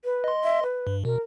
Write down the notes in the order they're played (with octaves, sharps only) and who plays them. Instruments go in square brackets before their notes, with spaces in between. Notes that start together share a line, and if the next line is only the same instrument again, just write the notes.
[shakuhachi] B4
[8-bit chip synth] D#5 C6
[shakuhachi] E5
B4
[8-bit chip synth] G2
[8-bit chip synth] B2 [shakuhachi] A#4